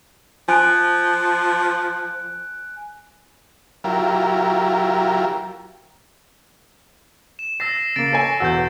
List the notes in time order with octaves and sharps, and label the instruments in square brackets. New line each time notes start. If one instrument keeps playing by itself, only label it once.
[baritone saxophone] F3 [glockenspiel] G#5 F#6 D7
[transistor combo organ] F#3 E4 F4 G4 A#4
[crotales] E7
[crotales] E6 A#6 C7 [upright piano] A6
[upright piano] C#3 A#3 [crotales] A6 D7
[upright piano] A4 C#5 G#5
[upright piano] E1 E2 F#4 [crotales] E6 G6